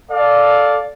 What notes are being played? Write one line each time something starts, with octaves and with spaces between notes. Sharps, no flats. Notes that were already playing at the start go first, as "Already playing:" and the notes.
A4 D5 F5